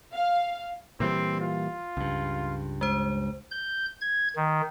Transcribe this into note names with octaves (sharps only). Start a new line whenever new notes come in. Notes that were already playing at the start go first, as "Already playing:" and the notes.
F5
A#2 E3 G3 C4
F4
C#2 G2
G#3 C5
G6
G#6
D#3